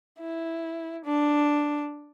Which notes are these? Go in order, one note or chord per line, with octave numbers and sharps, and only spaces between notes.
E4
D4